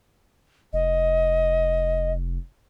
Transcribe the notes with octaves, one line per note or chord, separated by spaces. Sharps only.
F1 D#5